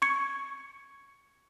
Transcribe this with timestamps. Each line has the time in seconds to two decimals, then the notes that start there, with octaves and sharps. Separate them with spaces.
0.02 C#6 G#6 C#7